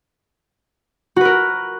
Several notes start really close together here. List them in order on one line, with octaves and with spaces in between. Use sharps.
F#4 B4 A#4